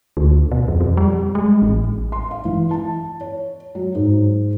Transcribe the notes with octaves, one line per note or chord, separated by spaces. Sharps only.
D2
B2
F2
F2
G3
G#3
A1
C6
F5
E3
A5
C#5
F#3
G#2